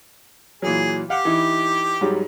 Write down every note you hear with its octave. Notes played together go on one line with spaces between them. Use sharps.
A#2 E3 F#3 G#4
G4 F5 F#5
E3 D#4 E4
G#2 F#3 G3